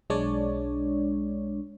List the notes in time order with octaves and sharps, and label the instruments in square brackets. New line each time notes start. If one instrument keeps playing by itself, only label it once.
[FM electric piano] B1 G#3 D4 C#5 D5